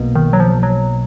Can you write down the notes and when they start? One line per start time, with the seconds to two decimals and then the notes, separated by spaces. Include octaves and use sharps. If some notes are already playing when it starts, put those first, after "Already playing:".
Already playing: B1 B2 A#3
0.16 D#3
0.33 F#3
0.40 F3
0.63 F#3